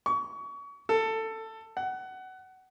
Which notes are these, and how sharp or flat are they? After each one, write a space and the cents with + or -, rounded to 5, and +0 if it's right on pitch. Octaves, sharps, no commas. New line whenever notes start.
C#6 +30
A4 +15
F#5 +20